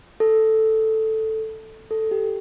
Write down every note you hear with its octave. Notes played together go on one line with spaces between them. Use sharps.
A4
A4
G4